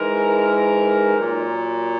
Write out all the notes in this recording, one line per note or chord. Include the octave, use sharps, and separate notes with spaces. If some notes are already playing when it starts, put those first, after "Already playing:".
Already playing: G#2 E3 G#3 A#4
A#2 F#3